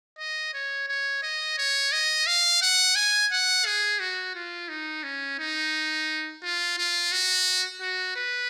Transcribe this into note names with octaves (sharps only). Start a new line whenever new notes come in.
D#5
C#5
C#5
D#5
C#5
D#5
F5
F#5
G#5
F#5
G#4
F#4
F4
D#4
C#4
D#4
F4
F4
F#4
F#4
B4